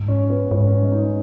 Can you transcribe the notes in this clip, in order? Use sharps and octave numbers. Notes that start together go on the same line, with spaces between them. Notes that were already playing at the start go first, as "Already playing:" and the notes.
Already playing: G#2
C#4
B3
G#2 C#4
C#4
G#3
D#4
C#4